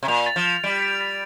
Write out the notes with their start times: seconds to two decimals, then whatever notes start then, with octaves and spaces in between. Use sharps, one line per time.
0.03 C3
0.08 A#2 F7
0.26 A6
0.36 F3
0.45 F7
0.64 G3 D7
0.82 D7
1.01 A6